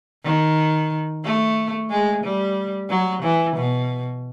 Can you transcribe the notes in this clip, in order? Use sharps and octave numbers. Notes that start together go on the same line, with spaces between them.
D#3
A3
G#3
G3
F#3
E3
B2